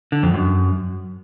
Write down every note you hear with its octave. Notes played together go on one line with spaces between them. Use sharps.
D3
F2
F#2